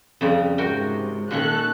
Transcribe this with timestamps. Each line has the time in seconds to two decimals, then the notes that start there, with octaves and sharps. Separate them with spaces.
0.21 F2 C#3 G3
0.58 G#2 C3 F#4 A#4 G5
1.31 A#2 D#3 C#4 A4 F#6